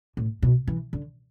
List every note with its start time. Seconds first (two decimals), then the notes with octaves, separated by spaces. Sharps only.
0.17 A2
0.42 B2
0.68 E3
0.93 D3